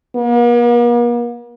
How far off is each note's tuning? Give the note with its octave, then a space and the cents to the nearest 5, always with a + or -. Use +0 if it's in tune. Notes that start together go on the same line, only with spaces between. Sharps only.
A#3 +45